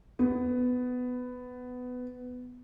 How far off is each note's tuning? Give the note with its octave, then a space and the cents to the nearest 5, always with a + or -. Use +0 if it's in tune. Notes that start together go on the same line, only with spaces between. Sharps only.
B3 +15